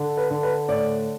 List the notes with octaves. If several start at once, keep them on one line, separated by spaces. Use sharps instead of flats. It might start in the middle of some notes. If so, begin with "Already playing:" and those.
Already playing: D3
B4
D3
B4
A2 D5